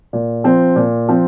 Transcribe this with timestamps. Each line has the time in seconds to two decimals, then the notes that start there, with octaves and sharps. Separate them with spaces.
0.13 A#2
0.44 F3 C4
0.76 A#2
1.08 F3 C4